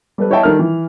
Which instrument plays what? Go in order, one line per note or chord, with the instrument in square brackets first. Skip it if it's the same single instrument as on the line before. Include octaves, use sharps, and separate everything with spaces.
[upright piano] G3 A4 B4
E4 C#5 D#5 E5 G5 A5
D#3 G3 A4 A#4 F6
E3